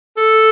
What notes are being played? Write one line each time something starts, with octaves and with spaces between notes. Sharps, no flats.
A4